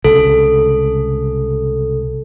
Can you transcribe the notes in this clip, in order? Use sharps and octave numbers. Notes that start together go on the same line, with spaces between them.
C2 C#3 G#3 A4